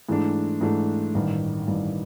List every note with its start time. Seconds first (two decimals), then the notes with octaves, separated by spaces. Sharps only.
0.09 G#2 E3 A3 D4
0.61 G#2 E3 A3 D4
1.15 A1 G2 D#3
1.68 A1 G2 D#3